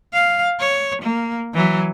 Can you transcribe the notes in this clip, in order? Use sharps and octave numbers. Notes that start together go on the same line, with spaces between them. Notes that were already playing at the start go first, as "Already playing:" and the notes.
F5
C#5
A#3
E3 F#3